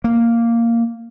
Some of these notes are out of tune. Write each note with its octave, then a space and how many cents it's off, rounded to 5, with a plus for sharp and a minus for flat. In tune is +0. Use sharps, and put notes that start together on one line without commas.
A#3 -5